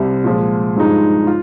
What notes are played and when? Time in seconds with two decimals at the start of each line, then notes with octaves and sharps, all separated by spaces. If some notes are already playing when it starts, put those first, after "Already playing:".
Already playing: C2 C3 G3
0.24 A#2 F3 G#3
0.76 G2 F3 G#3 D#4
1.27 F4